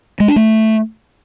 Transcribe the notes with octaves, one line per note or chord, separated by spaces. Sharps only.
G#3
D4
A3